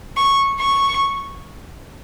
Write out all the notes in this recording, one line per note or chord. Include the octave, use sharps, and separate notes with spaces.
C#6
C#6